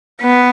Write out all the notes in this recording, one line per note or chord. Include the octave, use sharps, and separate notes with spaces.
B3